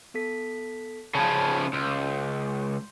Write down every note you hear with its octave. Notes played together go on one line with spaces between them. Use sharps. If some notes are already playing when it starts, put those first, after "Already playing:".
B3 A4 B6
C#3 F3 A5 B5 G#6
C#2 C6 G6